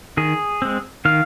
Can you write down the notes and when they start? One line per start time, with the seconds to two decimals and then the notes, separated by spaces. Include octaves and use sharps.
0.17 D#3 G#4
0.62 G#3 C4
1.05 D#3 F5